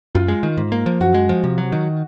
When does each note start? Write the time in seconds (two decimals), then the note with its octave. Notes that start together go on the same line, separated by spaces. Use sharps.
0.15 F#2 F4
0.28 G#3
0.43 D#3
0.57 G#2
0.72 A#3
0.86 F3
1.00 F#2 F#4
1.14 G#3
1.29 F3
1.44 C3
1.58 F#3
1.72 D#3